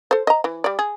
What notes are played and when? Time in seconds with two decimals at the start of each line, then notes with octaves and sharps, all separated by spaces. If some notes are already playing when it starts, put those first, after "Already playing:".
0.11 A4 C5
0.27 D#5 A#5
0.44 E3
0.64 G3 D5
0.79 G#4